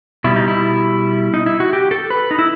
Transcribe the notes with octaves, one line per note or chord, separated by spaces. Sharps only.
B2 G3 E4
D#4
E4
D#4
E4
F#4
G4
A4
B4
D#4
E4